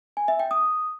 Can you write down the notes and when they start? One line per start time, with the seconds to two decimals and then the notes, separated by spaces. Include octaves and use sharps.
0.17 G#5
0.28 E5
0.39 G5
0.51 D#6